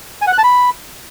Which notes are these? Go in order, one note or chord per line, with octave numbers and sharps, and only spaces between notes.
G#5
F#5
F#6
A5
B5